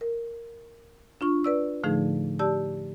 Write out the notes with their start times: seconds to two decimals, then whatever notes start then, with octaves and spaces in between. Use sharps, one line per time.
0.01 A#4
1.21 D4 F4 C#6
1.44 B4 D5 E6
1.83 A2 D3 F3 A3 D#4 G#4
2.39 G4 D5 A5 E6